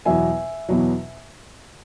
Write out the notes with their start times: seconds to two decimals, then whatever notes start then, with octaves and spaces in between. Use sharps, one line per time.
0.05 E2 B2 F#3 E5 G#5
0.69 E2 B2 F#3